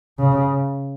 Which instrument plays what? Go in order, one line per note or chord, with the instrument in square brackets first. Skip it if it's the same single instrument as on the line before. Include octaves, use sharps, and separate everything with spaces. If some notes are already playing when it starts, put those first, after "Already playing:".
[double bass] C#3